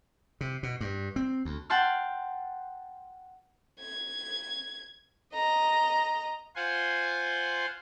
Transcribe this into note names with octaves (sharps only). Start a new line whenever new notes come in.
C3
B2
G2
C4
D2
F#5 G5 A5 C6 F6
G#6
D#5 A#5
F4 C5 F#5 G#5 C6